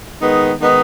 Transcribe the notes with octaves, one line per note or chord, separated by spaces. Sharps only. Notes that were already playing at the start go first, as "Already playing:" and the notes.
D#3 G#3 B3 D#4
D#3 G#3 B3 D#4